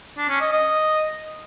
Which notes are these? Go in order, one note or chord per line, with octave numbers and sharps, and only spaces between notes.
D4
C#4
D#5
D#5